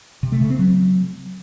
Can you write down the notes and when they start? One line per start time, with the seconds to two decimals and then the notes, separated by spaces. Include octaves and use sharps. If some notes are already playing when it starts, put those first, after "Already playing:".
0.23 C3
0.32 A3
0.41 C#3
0.50 C4
0.59 F#3